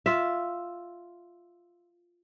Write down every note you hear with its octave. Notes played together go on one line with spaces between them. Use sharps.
F4 E5